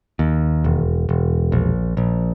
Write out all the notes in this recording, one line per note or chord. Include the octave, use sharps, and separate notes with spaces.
D#2
E1
E1
A#1
A#1